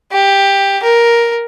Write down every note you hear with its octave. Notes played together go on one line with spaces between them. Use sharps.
G4
A#4